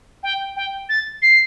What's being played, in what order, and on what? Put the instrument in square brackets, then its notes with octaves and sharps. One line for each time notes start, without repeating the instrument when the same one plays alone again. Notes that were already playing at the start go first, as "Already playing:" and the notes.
[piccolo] G5
G5
A6
C7